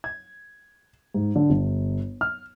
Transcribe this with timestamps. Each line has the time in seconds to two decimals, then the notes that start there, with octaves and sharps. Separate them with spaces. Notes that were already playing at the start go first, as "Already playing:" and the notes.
0.04 G#6
1.14 G#2
1.36 D3
1.50 G1
2.21 F6